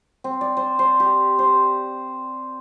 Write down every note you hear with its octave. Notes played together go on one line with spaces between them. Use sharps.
C4
D5
C5
C5
G4
C5